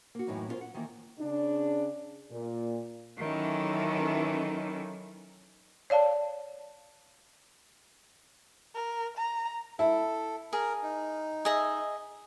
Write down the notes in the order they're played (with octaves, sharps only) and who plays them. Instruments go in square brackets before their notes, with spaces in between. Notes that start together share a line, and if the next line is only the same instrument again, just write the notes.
[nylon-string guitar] A#3 F#4
F#2 A2 E3 F#3 D#4
C#4 D4 F4 G#4 A#4 C5
F#5
D#3 E3 A#3
[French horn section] C#3 D4
A#2
[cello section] D#3 E3 F#3 C#4 A4
[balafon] C#5 D5 F5 A5
[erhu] A#4
A#5
[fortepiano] E4 [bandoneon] A4
[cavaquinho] G#4 [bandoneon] A#4
[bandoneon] D#4
[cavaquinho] G#4 D#5 E5